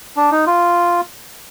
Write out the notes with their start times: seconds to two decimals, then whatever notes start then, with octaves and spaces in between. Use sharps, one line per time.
0.17 D4
0.31 D#4
0.47 F4